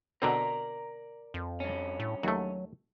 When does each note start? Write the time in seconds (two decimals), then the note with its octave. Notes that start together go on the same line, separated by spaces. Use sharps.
0.22 B2 D3 C4 A#4 D5 A#5
1.34 F2
1.60 G2 C#4
2.00 A2
2.23 D#2 F#3 A3